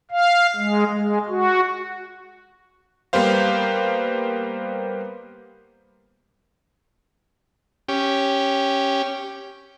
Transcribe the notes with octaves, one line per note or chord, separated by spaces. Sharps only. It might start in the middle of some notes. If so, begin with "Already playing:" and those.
F5
G#3
G#3
F#4
G3 A#3 B3 G4 C5 F5
C#4 G4